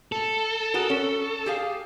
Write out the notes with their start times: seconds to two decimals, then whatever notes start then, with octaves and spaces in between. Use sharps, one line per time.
0.12 A4
0.74 F#4 G#4 A#4
0.90 C#4
1.46 G4 G#4 F5